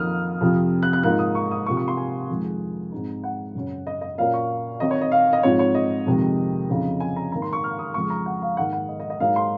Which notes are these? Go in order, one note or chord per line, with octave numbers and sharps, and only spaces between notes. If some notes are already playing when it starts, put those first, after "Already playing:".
Already playing: F2 D#3 A#3 D#4 D#6 F6
F2 C3 F3 C4
F#6
F#6
G#2 F3 A#3 D#4 F#6
D#6
C#6
D#6
C3 F3 A#3 C#6
C#6
C6
G#5
F2 D#3 G#3
G#2 F#3 C4 D#4
F#5
F#2 C#3 F#3 C#4
D#5
D#5
A#2 F#3 A#3 C#4 F5
C#6
D#3 F#3 C4 D#4 D#5
C#5
D#5
F5
D#5
G#2 F3 C4 C#5
C#5
D#5
F2 C3 D#3 G#3
F2 C#3 F#3 C4 D#4
G#5
A#5
G#2 D#3 A#3 A#5
C6
C#6
F6
D#6
F2 C#3 G#3 C#6
A#5
F#5
F5
G#2 D#3 A#3 F#5
F#5
D#5
D#5
D#5
G#2 F#3 A#3 D#4 F5
C6